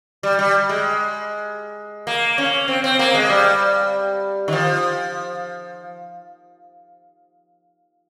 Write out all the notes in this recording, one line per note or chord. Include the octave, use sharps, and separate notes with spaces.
G3
G3
G#3
A#3
C#4
C4
C4
A#3
G#3
G3
D#3
F3